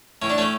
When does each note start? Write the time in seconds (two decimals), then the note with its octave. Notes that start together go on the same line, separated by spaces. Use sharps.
0.22 A2 C#4
0.30 D4
0.38 A3 C#4